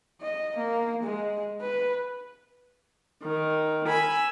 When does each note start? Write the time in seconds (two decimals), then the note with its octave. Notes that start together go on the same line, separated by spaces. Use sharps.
0.21 D#5
0.57 A#3
1.03 G#3
1.61 B4
3.23 D#3
3.86 G#5 B5 E6